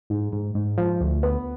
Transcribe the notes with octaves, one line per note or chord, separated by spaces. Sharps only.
G#2
G#2
G#2
F3
D2
B3